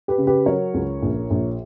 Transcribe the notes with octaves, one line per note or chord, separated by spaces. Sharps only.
G4 B4
C#3
G4 B4
F#3 A#4 C#5
C#2
A#1
A#1